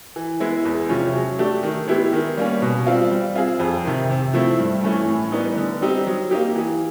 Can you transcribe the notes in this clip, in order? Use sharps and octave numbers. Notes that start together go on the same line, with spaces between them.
E3
G#3 B3 E4
E2
C3 F3 G#3 C#4
F#3
A3 D4 G4
D#3
G#3 B3 E4 G4
D#3
G3 A#3 C#4
B2
G3 C4 F4
G3
C4 F4 G#4
F2
C3 D#3
C3
F3 A3 C4 E4
G2
E3 A3 C#4
A2
E3 G3 B3 D#4
D3
G3 C4 D#4 G4
F#3
A#3 D#4 G4
E3